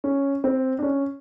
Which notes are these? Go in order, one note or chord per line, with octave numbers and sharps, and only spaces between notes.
C#4
C4
D4
C#4